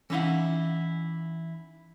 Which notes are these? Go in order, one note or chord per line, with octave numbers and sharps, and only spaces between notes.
E3 C#4 D#4 E4 F5 F#5